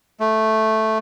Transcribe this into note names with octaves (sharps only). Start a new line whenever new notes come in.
A3